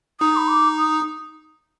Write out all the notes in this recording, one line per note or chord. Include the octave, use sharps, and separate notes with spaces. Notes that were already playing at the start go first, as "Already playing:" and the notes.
D#4 D#6
B5
D6
D#6